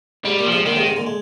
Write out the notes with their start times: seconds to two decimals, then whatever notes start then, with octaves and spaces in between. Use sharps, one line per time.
0.25 G#2 G3
0.39 A#2
0.46 F3
0.52 G#2 C3
0.66 A#2 D3 D#3
0.76 G#2 C3
0.86 G#2 C3
0.96 A#2 D3
1.07 G#3